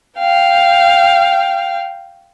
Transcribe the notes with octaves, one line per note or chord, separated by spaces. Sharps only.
F5 G5